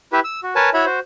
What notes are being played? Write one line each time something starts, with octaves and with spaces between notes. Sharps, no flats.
E4 G4 B4 E5
E6
F#4
A#4 B4 C#5 G#5 A5
E4 F#4 C#5 E5 B5
F#4 C5